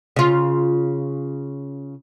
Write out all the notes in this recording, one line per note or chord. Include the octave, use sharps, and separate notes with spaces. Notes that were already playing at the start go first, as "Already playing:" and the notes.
C#3 F4